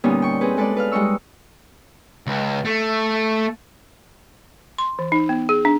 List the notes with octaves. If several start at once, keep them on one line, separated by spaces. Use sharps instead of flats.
A#2 D3 G3 B3 C#4 D#4
G5 C#6
C4 G#4 B4
G#3 A4 B4 D5
B4 F5 F6
G3 G#3 D#4 C#6 E6
C#2
A3
C6
E3
D#4
B3
G#4
D4